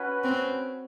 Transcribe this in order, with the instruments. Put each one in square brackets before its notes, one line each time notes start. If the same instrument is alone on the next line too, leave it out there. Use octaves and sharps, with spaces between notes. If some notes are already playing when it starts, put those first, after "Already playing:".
Already playing: [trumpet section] C#4 F#4 B4
[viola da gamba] C4